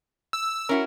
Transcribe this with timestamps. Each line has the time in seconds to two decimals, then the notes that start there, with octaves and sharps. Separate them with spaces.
0.33 E6
0.69 C#4 E4 F#4 A#4